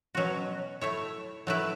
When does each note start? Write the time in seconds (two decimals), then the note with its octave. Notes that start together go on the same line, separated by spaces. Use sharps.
0.15 B2 F#3 C#4 F#4
0.81 A3 E4 C#5
1.47 F#3 A3 E4 B4